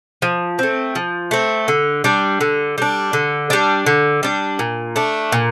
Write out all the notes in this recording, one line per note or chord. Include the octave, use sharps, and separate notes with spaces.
F3
A3 C4
F3
A3 C4
D3
G3 D4
D3
G3 D4
D3
G3 D4
D3
G3 D4
A#2
A3 D4
A#2